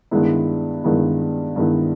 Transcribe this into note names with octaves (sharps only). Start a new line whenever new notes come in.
G2 D#3 G#3 B3 E4
G2 D#3 G#3 B3 E4
G2 D#3 G#3 B3 E4